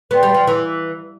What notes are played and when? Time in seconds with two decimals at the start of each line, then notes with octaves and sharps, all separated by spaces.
0.11 B3 B4 D5 G5 C6
0.23 G3
0.34 F3
0.47 E3